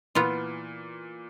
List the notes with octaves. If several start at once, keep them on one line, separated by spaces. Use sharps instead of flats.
A#2 E3 B3 F4